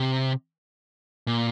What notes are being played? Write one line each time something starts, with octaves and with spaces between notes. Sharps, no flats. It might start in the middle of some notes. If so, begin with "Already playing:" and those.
Already playing: C3
A#2